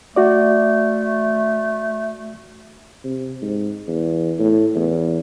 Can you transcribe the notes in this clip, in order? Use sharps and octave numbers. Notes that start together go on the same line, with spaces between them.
A3 F#4 D5
C3
G#2
E2
A2
E2